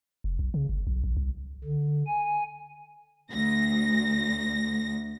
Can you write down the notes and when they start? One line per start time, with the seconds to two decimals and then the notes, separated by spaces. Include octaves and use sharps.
0.24 F1
0.39 B1
0.54 C#3
0.69 G1
0.87 B1
1.04 A#1
1.17 C2
1.64 D3
2.07 G#5
3.32 D2 A#6